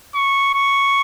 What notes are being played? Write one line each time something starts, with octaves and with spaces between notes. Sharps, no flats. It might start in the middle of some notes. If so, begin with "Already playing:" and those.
C#6
C#6